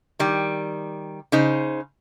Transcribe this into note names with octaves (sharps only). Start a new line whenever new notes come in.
D#3 G3
C#3 D#4 C5